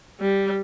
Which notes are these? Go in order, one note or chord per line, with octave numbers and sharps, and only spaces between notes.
G3